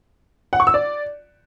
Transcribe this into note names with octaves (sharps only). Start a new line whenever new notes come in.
F#5
C#6
E6
D5